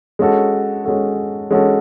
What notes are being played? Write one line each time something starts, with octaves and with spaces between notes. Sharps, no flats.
G#3 C#4 F#4 A4
G#3 C#4 F#4 A4
G#3 C#4 F#4 A4